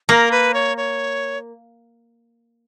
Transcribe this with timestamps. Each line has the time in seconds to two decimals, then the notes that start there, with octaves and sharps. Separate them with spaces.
0.09 A#3 A#4
0.32 B4
0.54 C#5
0.77 C#5